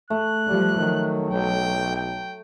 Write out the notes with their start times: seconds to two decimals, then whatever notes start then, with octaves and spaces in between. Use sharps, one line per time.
0.10 A3 F#6
0.47 F3 G3
0.78 D#3 F#3
1.31 B1 G5
1.96 G5